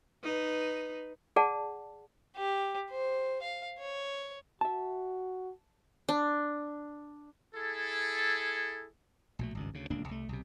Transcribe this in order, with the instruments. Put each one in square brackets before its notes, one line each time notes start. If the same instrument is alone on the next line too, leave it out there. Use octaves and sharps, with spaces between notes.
[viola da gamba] D#4 B4
[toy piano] G#4 D5 F#5 A5
[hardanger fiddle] G4
C5
F5
C#5
[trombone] F#4 [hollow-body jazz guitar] E5 A5
[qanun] D4
[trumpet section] E4 G#4 A4
[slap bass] A#1 B2 A3
G#1 C#2 G2
D2 C#3
D1 C#2 A#3 D4
C2 A3
B1 C3